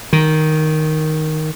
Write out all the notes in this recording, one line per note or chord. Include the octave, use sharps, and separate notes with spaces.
D#3